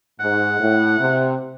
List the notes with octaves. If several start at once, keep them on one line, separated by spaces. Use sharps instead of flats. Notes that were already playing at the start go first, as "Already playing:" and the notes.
G#2 F#5
A2
C3